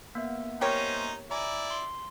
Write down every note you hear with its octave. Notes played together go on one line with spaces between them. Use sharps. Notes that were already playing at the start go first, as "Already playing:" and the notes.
A#3 B3 E5
C#4 D#4 G4 A#4 C5 C#5
E4 D5 G#5 A#5
C6